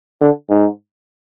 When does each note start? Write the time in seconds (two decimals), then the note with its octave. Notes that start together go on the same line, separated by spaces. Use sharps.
0.21 D3
0.50 G#2